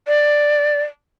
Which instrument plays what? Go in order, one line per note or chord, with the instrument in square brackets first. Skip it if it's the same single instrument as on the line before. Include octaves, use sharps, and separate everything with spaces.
[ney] D5